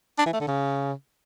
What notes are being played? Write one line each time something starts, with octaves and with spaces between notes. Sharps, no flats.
D4
E3
A3
D3
C#3